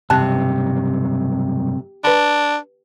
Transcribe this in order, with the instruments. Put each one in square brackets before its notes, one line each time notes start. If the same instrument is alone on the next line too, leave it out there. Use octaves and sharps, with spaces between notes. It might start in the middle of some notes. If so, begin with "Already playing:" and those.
[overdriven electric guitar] B1 G2 [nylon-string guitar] C3 [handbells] A5 F#6
[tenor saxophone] D4 [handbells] B4 B5